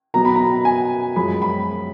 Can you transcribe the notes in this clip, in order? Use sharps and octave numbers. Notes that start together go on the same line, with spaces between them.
B2 F#3 B3 D#4 A#5
B5
A#5
G#5
F#2 F3 G#3 B5
B5